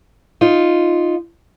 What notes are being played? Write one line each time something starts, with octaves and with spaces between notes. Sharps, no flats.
D#4 F4